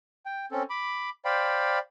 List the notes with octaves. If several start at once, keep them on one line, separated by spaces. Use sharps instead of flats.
G5
C4 C#4 A4
B5 D6
C5 D5 F5 G5 B5